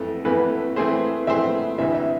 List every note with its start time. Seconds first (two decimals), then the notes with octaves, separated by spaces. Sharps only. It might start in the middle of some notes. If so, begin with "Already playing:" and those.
Already playing: F2 E3 A3 A4
0.25 F2 E3 A3 B4
0.76 E3 A3 C4 G#4 C5
1.27 E3 A3 C4 G#4 C5 E5
1.78 D2 C3 E3 E5
1.95 E5